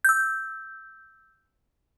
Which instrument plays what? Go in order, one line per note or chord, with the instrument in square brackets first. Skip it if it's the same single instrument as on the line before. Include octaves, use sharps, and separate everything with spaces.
[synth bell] E6 G6